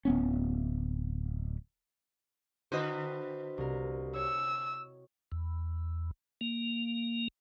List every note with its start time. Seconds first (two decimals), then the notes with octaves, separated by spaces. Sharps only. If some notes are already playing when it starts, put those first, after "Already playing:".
0.05 D1 B3 C#4
2.72 D3 E4 F#4 B4 C5 D#5
3.58 C2 A#4
4.16 C#5 E6
5.32 E2
6.41 A#3